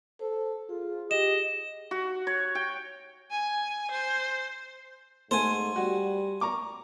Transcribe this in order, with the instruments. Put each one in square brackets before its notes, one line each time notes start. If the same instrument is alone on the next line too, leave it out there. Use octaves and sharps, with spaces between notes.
[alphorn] A4 [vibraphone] C5
[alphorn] F4 [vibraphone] G#4
[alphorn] G4 [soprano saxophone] D#5 [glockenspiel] E7
[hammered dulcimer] F#4
C#5
G5
[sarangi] G#5
C5
[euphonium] G#2 [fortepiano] A3 [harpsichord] C5 G#5
[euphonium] G3 [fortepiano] F#4
[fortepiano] A#5 C#6 D6